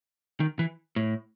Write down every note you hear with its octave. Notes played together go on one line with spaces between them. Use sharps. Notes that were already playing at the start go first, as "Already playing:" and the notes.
D#3
E3
A2